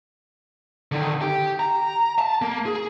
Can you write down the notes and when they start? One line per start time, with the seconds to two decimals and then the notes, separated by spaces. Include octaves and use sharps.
0.92 D3 D#3
1.22 G4
1.59 A#5
2.19 A5
2.42 A#3
2.66 G#4